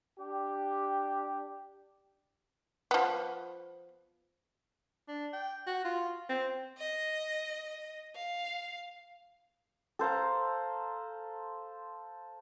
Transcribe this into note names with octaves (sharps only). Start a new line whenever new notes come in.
D4 G4
F3 B3
D4
G5
F#4
F4
C4
D#5
F5
A4 C5 F5 A#5